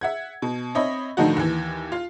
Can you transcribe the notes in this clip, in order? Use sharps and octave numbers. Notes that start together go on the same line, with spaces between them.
E5 F#5 G#6
B2
C4 C#5 D#5 E5 B5
A2 D3 D#3 F3 D#4 F#4
D#2 E3
F4